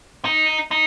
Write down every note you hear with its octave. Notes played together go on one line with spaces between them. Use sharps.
D#4
D#4